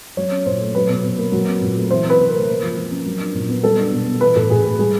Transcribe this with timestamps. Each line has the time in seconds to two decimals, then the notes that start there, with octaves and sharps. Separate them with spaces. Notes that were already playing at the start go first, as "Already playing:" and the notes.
0.17 F#3 C#5
0.31 C#4
0.46 A#2 C5
0.61 A3
0.75 F#3 B4
0.89 B2
1.04 B2
1.19 A#3
1.32 F#3
1.47 C4
1.61 A#2
1.76 A3
1.91 E3 C5
2.04 C4
2.10 B4
2.19 C3
2.29 A#4
2.34 A3
2.48 A#3
2.63 F3
2.77 F3
2.91 C#4
3.06 F#3
3.20 D4
3.35 A#2
3.49 B3
3.63 G3 A4
3.78 D4
3.92 B2
4.07 B3
4.21 E3 B4
4.35 A2 A4
4.50 A2 G#4
4.65 A3 G#4
4.79 G3 G#4